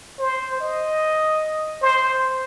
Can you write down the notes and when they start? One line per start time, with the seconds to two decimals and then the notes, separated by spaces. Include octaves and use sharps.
0.19 C5
0.60 D#5
1.82 C5